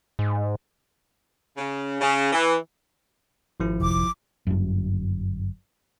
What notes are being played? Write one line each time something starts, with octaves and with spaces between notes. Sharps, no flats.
G#2
C#3
C#3
E3
G#1 F3 E4
F1 D6
G1 F#2